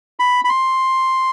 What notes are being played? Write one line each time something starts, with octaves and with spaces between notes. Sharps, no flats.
B5
B5
C6